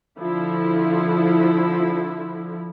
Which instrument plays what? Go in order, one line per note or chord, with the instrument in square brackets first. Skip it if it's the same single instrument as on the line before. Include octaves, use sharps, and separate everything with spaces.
[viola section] D3 F3 E4